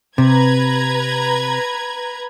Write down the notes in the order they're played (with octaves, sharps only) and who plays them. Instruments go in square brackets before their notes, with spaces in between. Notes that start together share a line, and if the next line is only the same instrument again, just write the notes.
[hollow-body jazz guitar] C3 [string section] B4 A#5 G#6